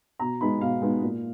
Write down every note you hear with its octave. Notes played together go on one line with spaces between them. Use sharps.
B2 A#5
G#3 B3 D#4 B5
B2 F5
G#3 B3 D#4
A#2